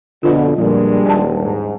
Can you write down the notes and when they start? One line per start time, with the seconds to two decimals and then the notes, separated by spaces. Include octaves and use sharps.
0.23 F2 B2 D3 F4 B4 D#5
0.58 A#2 F3 G3 G#3 D4
1.06 D#1 G#5 A5
1.41 G#2